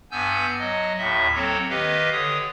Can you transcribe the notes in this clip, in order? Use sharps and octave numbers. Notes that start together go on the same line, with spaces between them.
G2 B3 G#5 E6 G6
F#3 D#5
D#2 A2 E5
F#3 A#3 C4 A4 C#5
D#3 G4 B4 D#5 F5
D3 C#5 D#6